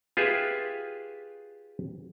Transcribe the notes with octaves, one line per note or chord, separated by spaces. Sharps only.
F4 G4 G#4 B4 E5